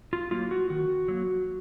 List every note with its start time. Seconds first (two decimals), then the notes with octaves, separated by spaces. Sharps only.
0.13 F4
0.31 F#3 A#3 F4
0.51 F#4
0.70 D#3 F#4
1.08 F#3 A#3